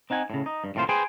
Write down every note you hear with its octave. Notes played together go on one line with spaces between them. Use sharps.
C4 D#4 F#5 G#5
A2 C#3
D#4
G2
D#2 A2 C3 F4 C5
G#4 B4 C5 G5 G#5